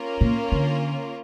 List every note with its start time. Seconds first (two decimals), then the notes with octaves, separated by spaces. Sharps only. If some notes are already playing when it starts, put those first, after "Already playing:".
Already playing: A#3 C#4 F4 A#4
0.21 A#2
0.52 D3